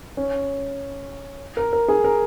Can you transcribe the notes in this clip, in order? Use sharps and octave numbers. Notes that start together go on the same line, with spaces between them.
C#4
A#4
A#4
G#4
A#4